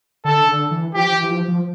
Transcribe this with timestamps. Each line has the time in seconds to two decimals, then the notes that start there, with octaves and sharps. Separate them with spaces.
0.25 D3 A4
0.48 D3
0.71 E3
0.95 F3 G4
1.12 E3
1.22 E3
1.30 F3
1.48 F3